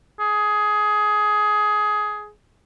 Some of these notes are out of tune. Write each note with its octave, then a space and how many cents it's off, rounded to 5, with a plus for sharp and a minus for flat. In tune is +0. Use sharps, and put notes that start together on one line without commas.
G#4 +15